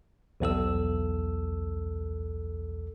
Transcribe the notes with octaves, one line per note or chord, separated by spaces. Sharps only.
B1 E2 A4 E6